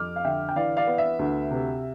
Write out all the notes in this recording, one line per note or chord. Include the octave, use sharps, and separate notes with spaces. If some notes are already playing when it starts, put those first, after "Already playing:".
Already playing: F2 D6 F6
F5
D3 E5 G5
G5
E3 D5 F5
D5 F5
B3
E5
D2
C3